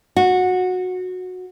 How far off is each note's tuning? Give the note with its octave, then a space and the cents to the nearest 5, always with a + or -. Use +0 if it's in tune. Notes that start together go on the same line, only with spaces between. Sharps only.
F#4 -15